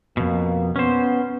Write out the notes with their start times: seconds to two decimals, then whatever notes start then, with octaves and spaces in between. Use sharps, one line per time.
0.17 F2 B2 A#3
0.76 B3 C#4 C5